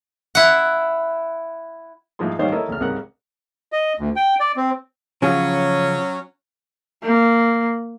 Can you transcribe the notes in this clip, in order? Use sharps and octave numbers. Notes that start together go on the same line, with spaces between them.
E4 F#5
G#2 F3 E4 G#4 C6
G2 D#3 D#4 C5 C#5 F5
E4 A4 A#4 C#5 D#5
D2 C#3 F6
C2 G#2 C#3 A#4 F#5 F#6
D#5
D2
G5
D5
C4
C#3 F3 F#3 C#4 G#4
A#3